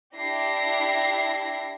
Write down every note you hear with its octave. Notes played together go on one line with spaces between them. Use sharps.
D4 E4 G4 A#6 C7